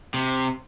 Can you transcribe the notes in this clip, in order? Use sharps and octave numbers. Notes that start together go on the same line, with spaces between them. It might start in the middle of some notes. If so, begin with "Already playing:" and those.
C3